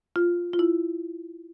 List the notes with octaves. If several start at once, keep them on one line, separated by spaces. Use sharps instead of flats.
F4
F4
E4